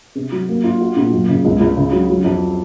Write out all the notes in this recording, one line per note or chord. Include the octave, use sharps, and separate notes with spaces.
C3
F#3
A#3
F4
F#4
A#2
F#2
C#3
C#2
C#2
C#3
F#3
F#3
F2